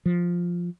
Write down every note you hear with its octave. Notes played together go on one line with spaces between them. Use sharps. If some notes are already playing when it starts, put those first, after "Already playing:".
F3